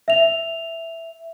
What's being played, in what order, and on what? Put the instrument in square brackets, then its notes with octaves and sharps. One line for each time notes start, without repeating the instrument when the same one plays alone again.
[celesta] E5 F7